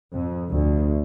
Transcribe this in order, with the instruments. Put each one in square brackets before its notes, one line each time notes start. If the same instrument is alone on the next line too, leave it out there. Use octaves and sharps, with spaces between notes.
[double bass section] F2
D2